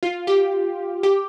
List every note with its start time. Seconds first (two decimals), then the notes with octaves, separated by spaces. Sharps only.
0.03 F4
0.27 G4
1.03 G4